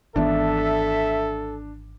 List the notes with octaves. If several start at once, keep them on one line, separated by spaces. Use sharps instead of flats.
G#1 E3 B3 D4 A4 E5